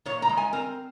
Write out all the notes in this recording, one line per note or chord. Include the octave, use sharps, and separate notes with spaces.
A#2 C#5
A#5
G#3
G#5
C4 A#4